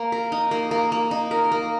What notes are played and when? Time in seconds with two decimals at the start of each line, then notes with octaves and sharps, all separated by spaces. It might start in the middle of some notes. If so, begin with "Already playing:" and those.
Already playing: A#3
0.12 A#4
0.32 D#4
0.51 A#3
0.71 A#3
0.92 A#3
1.11 D#4
1.31 A#4
1.52 A#3